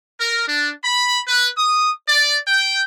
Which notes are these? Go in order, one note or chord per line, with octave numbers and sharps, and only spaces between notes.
A#4
D4
B5
B4
D#6
D5
G5